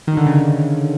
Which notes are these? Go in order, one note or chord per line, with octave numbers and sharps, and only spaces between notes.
D#3
D3
C#3